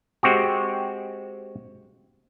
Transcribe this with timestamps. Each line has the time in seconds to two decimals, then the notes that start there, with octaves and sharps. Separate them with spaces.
0.23 G#3 C4 F#4 G4